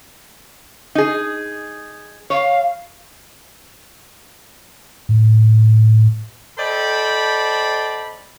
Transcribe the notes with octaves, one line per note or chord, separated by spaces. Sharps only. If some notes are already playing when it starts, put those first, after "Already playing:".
D#4 G#4
C#5 F5
A2
A4 C5 D5 D#5 G5 B5